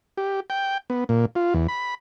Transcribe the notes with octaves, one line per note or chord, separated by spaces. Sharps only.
G4
G5
B3
A#2
F4
E2
B5